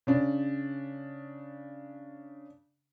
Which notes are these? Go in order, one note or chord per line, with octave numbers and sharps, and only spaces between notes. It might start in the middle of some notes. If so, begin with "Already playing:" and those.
C#3 D4